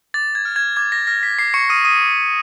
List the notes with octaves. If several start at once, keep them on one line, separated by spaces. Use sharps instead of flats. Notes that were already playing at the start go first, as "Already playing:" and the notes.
D6 A6
G#6
F6
G#6
D6 G#6
A#6
F6 A#6
B6
D6 C7
C#6 C#7
D#6 F6 D#7
D#6 D#7
D6